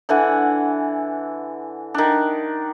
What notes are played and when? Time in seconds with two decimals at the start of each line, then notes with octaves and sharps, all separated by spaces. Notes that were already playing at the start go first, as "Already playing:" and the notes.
0.09 D3 E3 F#5 G#5
1.94 D#3 D4